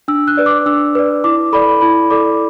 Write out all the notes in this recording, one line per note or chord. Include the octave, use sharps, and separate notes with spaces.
D4 E6
F#6
B4 D5
D6
D4 E6
B4 D5
E4 D6
A4 D5 B5
E4 B5
A4 D5 D6